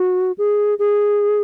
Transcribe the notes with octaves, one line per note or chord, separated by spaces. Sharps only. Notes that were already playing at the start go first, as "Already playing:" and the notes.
Already playing: F#4
G#4
G#4